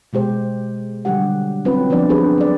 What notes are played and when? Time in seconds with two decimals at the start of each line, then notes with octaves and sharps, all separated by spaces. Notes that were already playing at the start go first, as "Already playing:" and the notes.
0.13 B2 G#3 G4 C5
1.05 D3 F#3 G3 G4 F#5
1.65 F#3 C4 C#4 F4 B4
1.90 F3 B3 C4 D4 D#4 D5
2.09 C4 D4 G4 G#4 B4 C5
2.38 F#3 D5